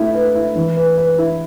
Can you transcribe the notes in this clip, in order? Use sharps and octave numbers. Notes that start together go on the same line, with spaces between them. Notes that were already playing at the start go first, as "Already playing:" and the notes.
Already playing: A3 E4
B4
E4
E3
B4
B4
E4